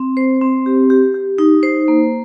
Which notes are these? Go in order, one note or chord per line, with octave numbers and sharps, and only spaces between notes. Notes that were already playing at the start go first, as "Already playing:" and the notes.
Already playing: C4
C5
C4
G4
G4
G4
D#4
C5
A#3